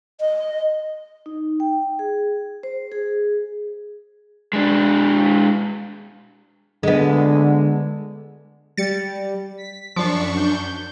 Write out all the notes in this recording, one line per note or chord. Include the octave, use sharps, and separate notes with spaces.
D#5
D#4
G5
G#4
C5
G#4
G#3 D4
D3 G#3 B3
G3 A6 C#7
B6
F#2 F3 D4 C#6
G6